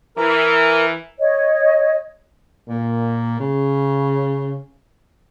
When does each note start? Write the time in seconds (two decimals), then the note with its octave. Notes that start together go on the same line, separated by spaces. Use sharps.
0.17 E3 A#4 A#5
1.19 C#5 D#5
2.69 A#2
3.40 C#3